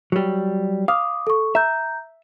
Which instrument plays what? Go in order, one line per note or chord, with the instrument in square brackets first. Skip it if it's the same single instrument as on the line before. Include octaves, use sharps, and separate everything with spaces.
[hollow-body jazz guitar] F#3 G3
[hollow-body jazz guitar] F5 [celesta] D6 D#6
[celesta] A4 C#6
[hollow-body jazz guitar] E5 [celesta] A#5 G6